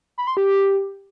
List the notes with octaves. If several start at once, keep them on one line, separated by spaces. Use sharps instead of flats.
B5
C6
G4